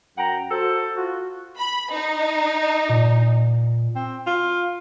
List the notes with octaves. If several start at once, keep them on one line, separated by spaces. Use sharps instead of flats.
F#2 F#5 G5 A#5
F#4 A4 C5
F4 F#4
B5
D#4
A#2
C4
F4